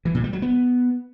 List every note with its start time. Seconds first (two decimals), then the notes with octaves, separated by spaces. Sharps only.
0.05 E3
0.15 A#2
0.24 G3
0.33 F#3
0.42 B3